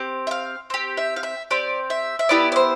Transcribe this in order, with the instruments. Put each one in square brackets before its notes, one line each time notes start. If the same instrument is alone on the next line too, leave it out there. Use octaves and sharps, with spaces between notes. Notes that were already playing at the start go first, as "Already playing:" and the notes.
Already playing: [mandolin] C4 G4
E5
F5
C4 G4
E5
F5
E5
C4 G4 D5
E5
E5
B3 E4 G4 D5
D5
C5